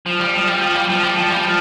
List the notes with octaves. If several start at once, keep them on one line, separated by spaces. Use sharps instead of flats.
F3
G3
F3
G3
F3
G3
F3
G3
F3
G3
F3